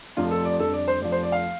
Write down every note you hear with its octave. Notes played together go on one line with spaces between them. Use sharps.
F1 F2 F3 F4
A4
D5
F2 D3 G3 A4
D5
C5
F1 F2 F3 D5
C5
D5
F5